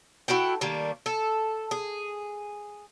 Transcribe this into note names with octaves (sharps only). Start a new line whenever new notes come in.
E4 F#4 A4 G5
D#3 G3 A3 A#3
A4
G#4